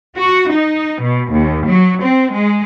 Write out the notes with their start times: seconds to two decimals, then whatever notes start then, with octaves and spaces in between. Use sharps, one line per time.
0.16 F#4
0.50 D#4
1.02 B2
1.32 D#2
1.66 F#3
2.01 C4
2.32 G#3